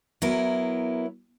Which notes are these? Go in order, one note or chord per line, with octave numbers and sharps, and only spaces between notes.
F#3 B3 E4 A#4